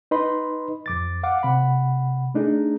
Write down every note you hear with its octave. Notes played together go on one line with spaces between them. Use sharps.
D#4 B4 D#5 B5 C6
F2 D6 A6
F5 F#5 D6
C3 F#5 B5
A3 D4 D#4 G#4